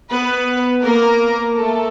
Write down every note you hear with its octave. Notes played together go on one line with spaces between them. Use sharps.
B3 B4
A#3 A#4
A3 A4